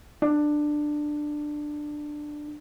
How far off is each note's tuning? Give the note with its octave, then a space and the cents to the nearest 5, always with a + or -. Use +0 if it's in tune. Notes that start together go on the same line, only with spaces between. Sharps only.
D4 +15